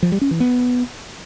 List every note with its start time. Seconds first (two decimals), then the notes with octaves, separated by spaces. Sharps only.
0.03 F3
0.12 G3
0.21 C#4
0.31 E3
0.40 B3